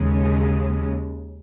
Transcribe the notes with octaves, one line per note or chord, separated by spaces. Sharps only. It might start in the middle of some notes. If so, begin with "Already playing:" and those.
Already playing: D#2 C#3 G#3